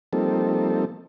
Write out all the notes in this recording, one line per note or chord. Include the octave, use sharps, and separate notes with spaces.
F3 G3 A#3 C4 D#4 A4